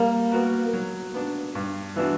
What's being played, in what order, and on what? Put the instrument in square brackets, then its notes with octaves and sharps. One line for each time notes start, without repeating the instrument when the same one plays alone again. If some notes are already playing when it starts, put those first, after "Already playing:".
Already playing: [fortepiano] G3 [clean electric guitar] A#3
[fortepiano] B3 F#4 A#4
F#3
B3 D4
G2
E3 B3 D4 F#4